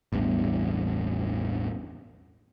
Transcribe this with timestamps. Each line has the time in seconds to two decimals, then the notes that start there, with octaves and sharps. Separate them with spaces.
0.12 A1 E2 G2